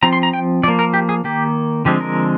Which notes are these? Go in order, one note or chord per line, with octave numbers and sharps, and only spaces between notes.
F3 C4 A#5
C6
A#5
G5
F3 A#3 D5
A#4
G4
G#4
D#3 A#3 G4
D3 F3 G#3 C4 G4
A#4